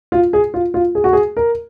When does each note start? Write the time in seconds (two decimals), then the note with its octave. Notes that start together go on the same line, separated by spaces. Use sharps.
0.12 F4
0.33 G#4
0.54 F4
0.74 F4
0.95 G#4
1.04 F#4
1.13 G#4
1.37 A#4